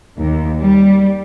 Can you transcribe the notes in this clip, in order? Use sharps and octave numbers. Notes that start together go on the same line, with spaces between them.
D#2
G3